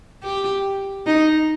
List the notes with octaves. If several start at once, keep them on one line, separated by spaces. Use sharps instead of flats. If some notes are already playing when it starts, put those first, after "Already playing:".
G4
D#4